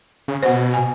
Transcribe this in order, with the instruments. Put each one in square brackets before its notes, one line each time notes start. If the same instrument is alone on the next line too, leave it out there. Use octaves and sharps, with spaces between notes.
[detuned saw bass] C#3
[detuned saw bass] B2 [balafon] C5 F#5
[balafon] G#5